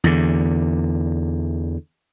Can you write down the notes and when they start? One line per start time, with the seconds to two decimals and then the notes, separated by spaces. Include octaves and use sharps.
0.04 E2 D3